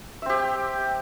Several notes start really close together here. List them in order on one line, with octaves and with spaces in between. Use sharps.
E5 C4 G4